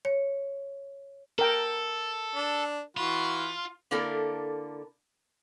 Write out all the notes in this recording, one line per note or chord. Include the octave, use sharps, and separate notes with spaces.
C#5
A4 A#4 G5
D4
E3 F4 F#4 B5
D3 A#3 E4 A4 A#4 D5